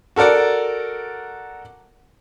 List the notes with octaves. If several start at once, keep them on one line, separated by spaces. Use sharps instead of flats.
F#4 A4 A#4 D5 F#5